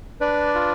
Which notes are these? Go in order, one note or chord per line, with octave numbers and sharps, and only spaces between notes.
D4 B4 D5
F4